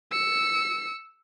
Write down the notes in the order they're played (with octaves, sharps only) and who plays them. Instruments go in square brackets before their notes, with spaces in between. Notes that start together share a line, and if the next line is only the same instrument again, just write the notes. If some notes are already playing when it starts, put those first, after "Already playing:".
[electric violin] E6 C#7